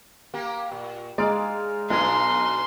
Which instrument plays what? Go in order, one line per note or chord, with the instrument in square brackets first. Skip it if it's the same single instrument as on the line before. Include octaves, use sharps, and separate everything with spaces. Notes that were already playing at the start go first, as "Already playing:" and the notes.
[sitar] A#3 G4
A#2
[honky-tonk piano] G#3 [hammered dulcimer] D#4 F5 [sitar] D5
[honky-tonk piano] B1 [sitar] B2 D4 D#4 [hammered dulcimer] F5 G#5 A#5 [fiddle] C6